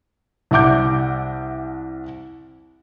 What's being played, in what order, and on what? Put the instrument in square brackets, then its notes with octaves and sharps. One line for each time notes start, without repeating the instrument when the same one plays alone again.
[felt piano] C2 E5 F#5 D6 G6